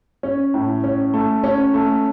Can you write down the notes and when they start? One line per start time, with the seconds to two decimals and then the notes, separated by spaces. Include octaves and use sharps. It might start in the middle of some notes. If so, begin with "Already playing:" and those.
0.23 C#4
0.54 A2
0.84 C#4
1.14 A3
1.44 C#4
1.74 A3